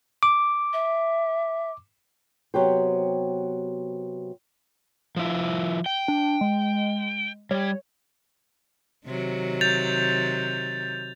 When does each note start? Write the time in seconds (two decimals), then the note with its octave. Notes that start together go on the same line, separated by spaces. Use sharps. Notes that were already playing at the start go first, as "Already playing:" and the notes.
0.23 D6
0.73 E5
2.54 C3 F#3 B3 G4 C5
5.16 F3 E4
5.86 G5
6.08 D4
6.41 G#3
7.51 G3 C#5
9.06 C3 D#3 F#3
9.61 G6 A6 F7